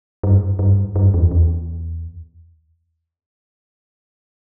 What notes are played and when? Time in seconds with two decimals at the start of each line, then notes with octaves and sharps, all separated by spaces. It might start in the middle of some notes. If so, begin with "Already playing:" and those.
0.23 G2
0.59 G2
0.96 G2
1.14 E2
1.31 E2